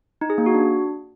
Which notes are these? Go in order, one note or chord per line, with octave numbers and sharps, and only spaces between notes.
D#4
G#4
A#3
F#4
D4